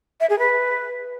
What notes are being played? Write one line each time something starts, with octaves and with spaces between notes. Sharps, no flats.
E5
G#4
B4